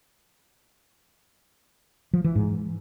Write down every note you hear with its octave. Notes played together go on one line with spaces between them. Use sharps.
F3
E3
G#2